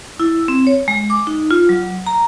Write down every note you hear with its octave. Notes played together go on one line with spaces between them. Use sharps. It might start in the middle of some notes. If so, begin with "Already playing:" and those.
E4
C4
C#5
G#3
D6
D#4
F4
F#3
A#5